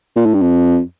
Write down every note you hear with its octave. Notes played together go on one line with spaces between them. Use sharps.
A#2
A2
G2
F2